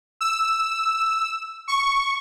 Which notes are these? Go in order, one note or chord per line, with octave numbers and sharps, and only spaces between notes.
E6
C#6